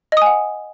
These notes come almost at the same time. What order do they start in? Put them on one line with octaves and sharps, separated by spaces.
D#5 D#6 G#5 F#5